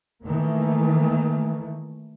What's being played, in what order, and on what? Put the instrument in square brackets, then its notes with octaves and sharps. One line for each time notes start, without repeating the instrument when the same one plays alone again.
[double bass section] D#3 E3 A3 A#3